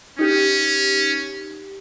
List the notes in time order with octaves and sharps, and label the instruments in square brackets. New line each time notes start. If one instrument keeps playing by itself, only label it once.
[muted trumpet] C#4 [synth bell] D#4 G4